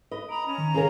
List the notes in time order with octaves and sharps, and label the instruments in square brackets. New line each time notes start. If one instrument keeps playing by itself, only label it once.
[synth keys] B4 B5 [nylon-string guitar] D#5
[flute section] A#5 B5 [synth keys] D#6 D7
[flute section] C#4 A#5
[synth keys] D#3
[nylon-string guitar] C#3 G#4 A#4